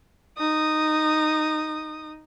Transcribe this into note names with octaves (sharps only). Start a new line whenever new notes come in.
D#4 D#6